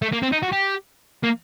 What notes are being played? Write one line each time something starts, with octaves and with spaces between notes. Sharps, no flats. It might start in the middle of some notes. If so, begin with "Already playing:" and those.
A3
A#3
C4
D#4
F#4
G4
A#3